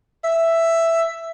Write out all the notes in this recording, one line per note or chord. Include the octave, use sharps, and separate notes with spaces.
E5